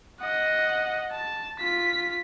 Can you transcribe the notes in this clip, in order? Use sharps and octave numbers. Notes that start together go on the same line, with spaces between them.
D#5 F#5
A5
F4 B6